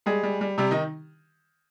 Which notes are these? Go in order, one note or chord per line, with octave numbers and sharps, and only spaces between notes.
G3 G#3 G#4
G3
G3
C3 G3 G4
D#3 D#4